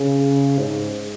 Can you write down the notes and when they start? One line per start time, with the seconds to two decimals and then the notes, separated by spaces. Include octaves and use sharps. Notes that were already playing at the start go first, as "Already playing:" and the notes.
Already playing: C#3
0.58 G#2